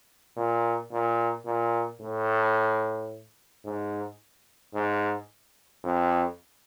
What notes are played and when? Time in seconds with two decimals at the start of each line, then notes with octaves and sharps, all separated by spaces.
0.36 A#2
0.91 A#2
1.46 A#2
2.00 A2
3.65 G#2
4.74 G#2
5.84 F2